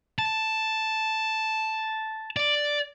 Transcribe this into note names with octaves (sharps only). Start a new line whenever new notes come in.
A5
D5